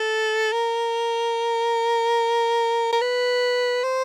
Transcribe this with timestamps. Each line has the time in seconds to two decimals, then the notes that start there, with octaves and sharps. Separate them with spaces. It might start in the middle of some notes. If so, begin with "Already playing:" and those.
Already playing: A4
0.53 A#4
2.93 A#4
3.01 B4
3.84 C5